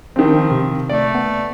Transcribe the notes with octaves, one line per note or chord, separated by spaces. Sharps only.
D#3 F3 C4
C3
A3 D5
B3